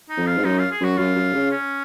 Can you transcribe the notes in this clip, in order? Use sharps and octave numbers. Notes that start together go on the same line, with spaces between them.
D#4
F2
F4
G#2
F#2 D#4
F4
G#4
F#2 F#4
F#2 F4
F#2
C#3
C#4